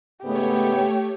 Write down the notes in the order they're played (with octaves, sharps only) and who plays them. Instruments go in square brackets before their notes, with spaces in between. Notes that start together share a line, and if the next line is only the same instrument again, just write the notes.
[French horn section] G#2 C#3 B3 [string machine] A3 C#5 [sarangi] G4